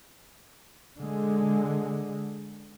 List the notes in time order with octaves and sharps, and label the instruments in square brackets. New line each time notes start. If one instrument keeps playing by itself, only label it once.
[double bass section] D3 G#3